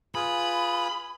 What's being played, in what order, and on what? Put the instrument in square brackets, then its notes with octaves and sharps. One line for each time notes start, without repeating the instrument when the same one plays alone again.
[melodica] F4 G#4 B4 [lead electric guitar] B5